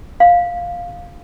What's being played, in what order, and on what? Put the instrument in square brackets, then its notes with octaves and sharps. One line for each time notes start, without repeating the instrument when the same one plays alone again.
[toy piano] F5